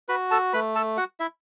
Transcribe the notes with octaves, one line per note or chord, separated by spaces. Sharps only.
F#4 B4 B5
A4 A5
A3 B4 B5
A4 A5
F#4 F#5
E4 E5